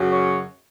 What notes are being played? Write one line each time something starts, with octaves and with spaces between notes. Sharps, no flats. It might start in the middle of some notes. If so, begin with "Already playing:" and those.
Already playing: F#2 C#3 F#3
C#5